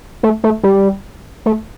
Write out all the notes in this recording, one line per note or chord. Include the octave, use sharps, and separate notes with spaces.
A3
A3
G3
A3